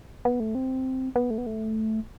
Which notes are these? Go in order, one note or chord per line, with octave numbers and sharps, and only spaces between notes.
B3
A3
C4
B3
A3
B3
A3